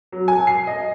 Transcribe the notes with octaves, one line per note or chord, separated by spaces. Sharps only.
F#3
G#5
C7
D#5